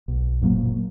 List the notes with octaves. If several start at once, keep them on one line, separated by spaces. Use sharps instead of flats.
B1
F#1 A#2 F#3 A#3